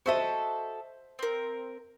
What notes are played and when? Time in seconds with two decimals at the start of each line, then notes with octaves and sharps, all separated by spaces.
0.06 F#4 A4 C5 D#5 E5
1.19 C4 A#4